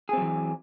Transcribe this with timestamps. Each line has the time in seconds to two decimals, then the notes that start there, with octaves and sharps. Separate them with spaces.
0.09 G#4
0.13 C4
0.17 F#3
0.22 E3